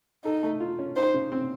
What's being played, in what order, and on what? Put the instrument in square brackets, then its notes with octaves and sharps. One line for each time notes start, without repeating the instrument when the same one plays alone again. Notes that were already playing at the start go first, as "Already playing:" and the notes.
[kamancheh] D#4 [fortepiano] A4
[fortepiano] A3
F4
C#4
[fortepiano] D#4 [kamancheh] C5
[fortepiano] C#3
C4